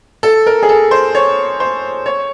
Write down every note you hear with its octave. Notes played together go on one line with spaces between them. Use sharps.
A4
A#4
G#4
A4
C5
C#5
C5
C#5